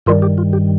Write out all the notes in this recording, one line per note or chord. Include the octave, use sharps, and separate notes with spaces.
G2 D#3 G3 F4
G4
F4
G4